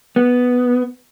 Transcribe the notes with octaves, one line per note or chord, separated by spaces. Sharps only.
B3